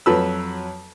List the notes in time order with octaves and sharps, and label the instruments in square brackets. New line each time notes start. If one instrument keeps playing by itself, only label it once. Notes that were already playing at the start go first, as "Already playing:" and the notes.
[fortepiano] F2 F#3 B4 E6